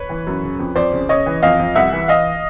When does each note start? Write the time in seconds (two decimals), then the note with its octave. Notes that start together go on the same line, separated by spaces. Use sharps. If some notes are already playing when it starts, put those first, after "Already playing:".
Already playing: B4 C#5
0.09 E3
0.27 F#2
0.43 C#3
0.59 F2
0.76 F2 C5 D5
0.92 C#3
1.09 C#3 C#5 D#5
1.26 E3
1.42 F2 D#5 F5
1.59 F2
1.75 C2 E5 F#5
1.92 E3
2.08 E3 D#5 F5